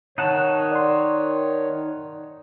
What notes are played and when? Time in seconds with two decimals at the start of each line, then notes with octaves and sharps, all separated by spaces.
0.18 D#3 D#4 C#5 F#5 A5
0.72 D5 C6